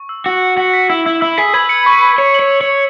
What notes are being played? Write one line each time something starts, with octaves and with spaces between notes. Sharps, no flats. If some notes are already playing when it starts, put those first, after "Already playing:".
Already playing: C#6
E6
F#4 E6
E6
F#4 B6
B6
E4 E6
E4 E6
E4 E6
G#4 B6
B4 G#6
C#7
C#6
C#7
C#5 C#6
C#5 F#7
C#6
C#5
F#7